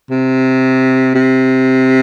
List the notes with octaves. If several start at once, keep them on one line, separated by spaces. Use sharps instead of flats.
C3
C3